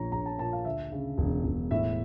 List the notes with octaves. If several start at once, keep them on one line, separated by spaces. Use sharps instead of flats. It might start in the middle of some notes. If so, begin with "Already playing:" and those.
Already playing: A#1 A#2 C#5 A#5
A#1 A#5
A5
A#2 A5
F5
D2 E5
C#3
E1
E1
A2 E5